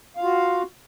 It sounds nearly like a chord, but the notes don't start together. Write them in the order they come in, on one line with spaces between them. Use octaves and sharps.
F5 F4 F#4